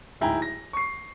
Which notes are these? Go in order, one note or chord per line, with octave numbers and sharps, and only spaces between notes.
D1 G#2 E4 G5 G#5 A#5
A#6
C#6 C7